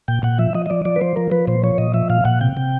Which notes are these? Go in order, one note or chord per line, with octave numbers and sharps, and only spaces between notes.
A#2 G5
A#2 F#5
F3 E5
F3 D#5
D#5
F3 D5
F3 D5
B4
F3 C5
F3 A#4
F3 B4
A#2 C5
F3 C#5
A#2 D#5
F3 E5
A#2 F5
A#2 F#5
C3 G5
C3